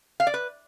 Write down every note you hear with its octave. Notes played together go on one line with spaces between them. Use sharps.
F5
D5
B4